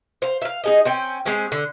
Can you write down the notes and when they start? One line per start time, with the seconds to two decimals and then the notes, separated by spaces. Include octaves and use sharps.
0.22 C5 F5
0.42 E5 F5
0.64 D#4 G#4 D#5
0.85 C4 C#4 G5
1.25 G#3 C4 C#4 G#4
1.52 D3